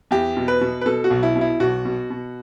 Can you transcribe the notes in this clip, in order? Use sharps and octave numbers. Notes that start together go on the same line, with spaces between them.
E2 G4
B2
B4
B2
B4
B2 A4
F#4
B1
E4
B2
E4
B1 F#4
B2
B2